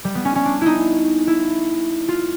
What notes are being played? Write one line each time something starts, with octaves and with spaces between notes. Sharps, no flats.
G3
B3
C#4
C#4
D4
D#4 E4
E4
F4